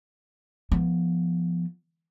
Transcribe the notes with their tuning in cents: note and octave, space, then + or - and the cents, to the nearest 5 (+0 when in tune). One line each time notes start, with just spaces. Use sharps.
F3 -15 B3 -10